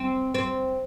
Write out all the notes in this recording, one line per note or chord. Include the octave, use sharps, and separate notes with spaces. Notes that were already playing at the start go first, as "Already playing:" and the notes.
Already playing: C4
C4